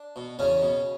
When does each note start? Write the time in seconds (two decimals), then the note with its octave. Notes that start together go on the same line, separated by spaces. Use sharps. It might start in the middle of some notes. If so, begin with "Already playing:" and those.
Already playing: D4
0.16 B2
0.39 E2 C#3 C#4
0.62 B2